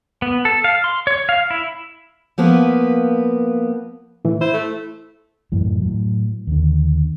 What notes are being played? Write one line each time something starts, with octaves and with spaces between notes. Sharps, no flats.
B3
A4
F5
C6
C#5
F5
E4
F3 A#3 B3 B4
A2 E3
E4 C5
A3
F#2 A2 E3
A2 F#3
D#2 D3